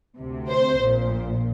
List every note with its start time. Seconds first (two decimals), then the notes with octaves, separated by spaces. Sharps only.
0.17 D2 C3
0.49 C5
0.80 A#1 A#2